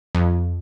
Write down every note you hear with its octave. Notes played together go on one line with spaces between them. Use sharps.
F2